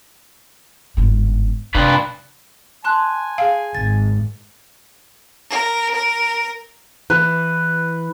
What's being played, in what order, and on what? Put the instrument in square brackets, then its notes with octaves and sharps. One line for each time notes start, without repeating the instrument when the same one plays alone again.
[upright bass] G1 G#2
[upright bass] C3 [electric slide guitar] D4 F4 B4
[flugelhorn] G#5 [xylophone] A5 C6 F#6
[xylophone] G#4 C7 [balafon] F5
[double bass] G#1 [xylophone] A6
[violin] A#4
A#4
[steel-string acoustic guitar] E3 [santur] B4